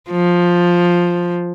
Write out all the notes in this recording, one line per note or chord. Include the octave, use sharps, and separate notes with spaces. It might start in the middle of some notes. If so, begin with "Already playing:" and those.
F3